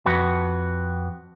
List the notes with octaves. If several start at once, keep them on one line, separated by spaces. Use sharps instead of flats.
F2 F#4 B4